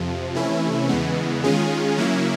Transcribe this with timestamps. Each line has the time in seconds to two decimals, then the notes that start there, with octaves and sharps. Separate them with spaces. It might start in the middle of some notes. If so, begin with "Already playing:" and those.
Already playing: F2 C3 F3
0.35 C3 E3 A3 C#4 E4
0.89 E2 C#3 E3 G#3 B3
1.44 D#3 G#3 C#4 F4 G#4
1.98 C#3 F#3 A#3 C#4 E4